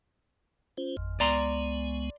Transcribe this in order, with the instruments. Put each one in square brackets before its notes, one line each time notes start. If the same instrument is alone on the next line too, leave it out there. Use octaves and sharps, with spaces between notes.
[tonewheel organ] C#4 F4 C5
G#1 F2
[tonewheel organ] C#2 G#3 B3 [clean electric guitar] D5 A#5 C6